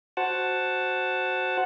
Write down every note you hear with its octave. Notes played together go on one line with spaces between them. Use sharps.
F#4 C5 F#5 A5